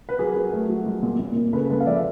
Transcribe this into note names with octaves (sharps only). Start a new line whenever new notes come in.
B4
F#3 G#4 A#4
F#3
A3
F#3
G#3
A#2
A#2
A#2
C#3 A4 B4
G#3 A4 B4
F5
F3 D5 E5